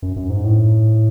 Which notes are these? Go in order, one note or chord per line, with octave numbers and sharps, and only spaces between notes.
F#2
F#2
G#2
A2